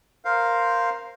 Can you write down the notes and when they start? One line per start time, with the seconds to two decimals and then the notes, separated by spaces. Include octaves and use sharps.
0.25 A#4 C5 F5